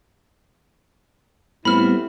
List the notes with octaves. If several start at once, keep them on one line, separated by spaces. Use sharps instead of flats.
A2 G3 B3 C4 E4 B5 F6